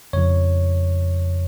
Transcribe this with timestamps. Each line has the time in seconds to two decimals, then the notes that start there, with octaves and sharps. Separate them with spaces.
0.13 F2 C#3 F3 C#5